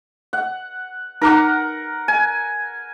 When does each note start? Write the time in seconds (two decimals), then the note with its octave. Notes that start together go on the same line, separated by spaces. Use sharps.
0.33 F#5
1.22 D#4 A#4 F#5 A#5 D6
2.08 G#5